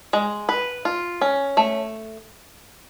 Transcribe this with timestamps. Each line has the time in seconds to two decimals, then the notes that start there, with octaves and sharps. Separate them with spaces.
0.13 G#3
0.49 B4
0.85 F4
1.21 C#4
1.57 A3